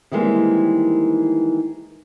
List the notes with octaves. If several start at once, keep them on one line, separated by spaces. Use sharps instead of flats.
D#3 E3 G3 G#3 A#3 C4